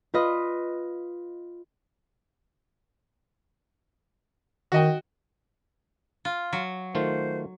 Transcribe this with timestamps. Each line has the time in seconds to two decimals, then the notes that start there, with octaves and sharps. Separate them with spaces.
0.14 F4 B4 D#5
4.72 D#3 F#4 D#5 G5
6.25 F4
6.53 F#3
6.95 D#3 A3 F4 C5